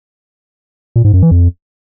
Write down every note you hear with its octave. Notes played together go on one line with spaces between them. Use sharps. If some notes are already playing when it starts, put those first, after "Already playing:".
A#2
G#2
F#2
E3
F2